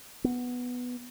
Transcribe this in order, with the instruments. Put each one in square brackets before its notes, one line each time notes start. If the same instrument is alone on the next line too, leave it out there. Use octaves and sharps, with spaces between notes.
[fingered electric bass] B3